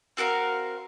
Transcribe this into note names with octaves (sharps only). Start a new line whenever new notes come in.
C4 F#4 A#4 F5